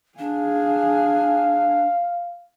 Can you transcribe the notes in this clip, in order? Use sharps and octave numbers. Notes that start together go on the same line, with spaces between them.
D4 G#4 F5 G#5